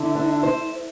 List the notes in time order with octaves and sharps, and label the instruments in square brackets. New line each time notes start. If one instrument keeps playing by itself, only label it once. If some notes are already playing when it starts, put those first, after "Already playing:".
Already playing: [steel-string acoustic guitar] D3 [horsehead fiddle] E4
[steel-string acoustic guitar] D4
C5